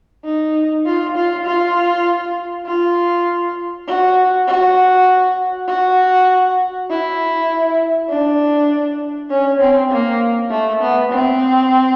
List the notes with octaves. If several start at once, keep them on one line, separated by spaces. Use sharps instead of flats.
D#4
F4
F4
F4
F4
F#4
F#4
F#4
E4
D4
C#4
C4
A#3
A3
B3
C4